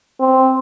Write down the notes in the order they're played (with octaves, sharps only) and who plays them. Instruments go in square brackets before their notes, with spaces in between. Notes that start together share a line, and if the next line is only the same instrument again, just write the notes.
[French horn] C4